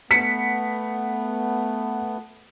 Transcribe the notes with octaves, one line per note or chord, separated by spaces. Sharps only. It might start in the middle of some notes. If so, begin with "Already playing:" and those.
A3 B3 B6 C#7